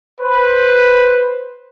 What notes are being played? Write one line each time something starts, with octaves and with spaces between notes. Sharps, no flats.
B4 C5